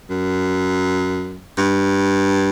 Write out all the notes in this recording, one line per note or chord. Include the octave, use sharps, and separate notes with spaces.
F#2
G2